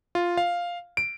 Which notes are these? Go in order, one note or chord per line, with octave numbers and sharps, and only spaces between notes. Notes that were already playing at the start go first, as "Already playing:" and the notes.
F4
F5
D7